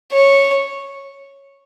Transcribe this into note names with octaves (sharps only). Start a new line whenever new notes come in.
C#5